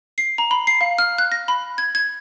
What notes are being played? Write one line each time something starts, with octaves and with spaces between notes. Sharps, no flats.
C7
A#5
B5
C7
F5
F6
F#6
A#6
B5
G#6
G#6